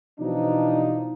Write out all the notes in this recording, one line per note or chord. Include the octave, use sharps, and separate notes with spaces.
B2 E3 F3 D4 D#4